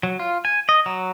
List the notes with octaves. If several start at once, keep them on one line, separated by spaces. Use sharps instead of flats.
F#3
F4
G#5
D#5
F#3